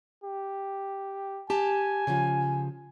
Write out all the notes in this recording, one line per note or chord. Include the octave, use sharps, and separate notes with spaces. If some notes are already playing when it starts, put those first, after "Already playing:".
G4
G4 G#5 A5
C#3 F3